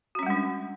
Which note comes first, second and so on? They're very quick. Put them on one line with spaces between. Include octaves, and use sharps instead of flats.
F#4 C#4 G3 G#3 D4